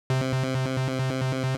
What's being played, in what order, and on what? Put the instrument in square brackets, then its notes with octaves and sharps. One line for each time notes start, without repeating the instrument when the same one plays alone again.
[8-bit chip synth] C3